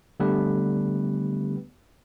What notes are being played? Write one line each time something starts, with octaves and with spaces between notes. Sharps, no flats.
D3 G3 A3 B3 G4 B4